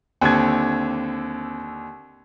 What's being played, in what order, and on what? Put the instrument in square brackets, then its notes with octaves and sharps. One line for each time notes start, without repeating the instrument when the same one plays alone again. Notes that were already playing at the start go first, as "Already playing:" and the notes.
[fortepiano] D#2 D3 [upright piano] C4 G#6